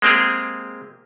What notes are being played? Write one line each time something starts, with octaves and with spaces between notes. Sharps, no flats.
G#3 A#3 C4 G4 G#4